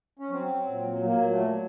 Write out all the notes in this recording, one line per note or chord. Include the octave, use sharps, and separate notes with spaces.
C#4
F#3 C4
F#3
A#2
F#3
F#3 A#3
A#2
A3
F#3